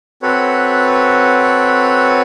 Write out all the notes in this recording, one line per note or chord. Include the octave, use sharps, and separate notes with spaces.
C4 F#4 A4 B4 C#5